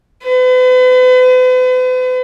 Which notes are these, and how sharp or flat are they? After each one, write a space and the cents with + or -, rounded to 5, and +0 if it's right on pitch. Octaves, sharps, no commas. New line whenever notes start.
B4 +45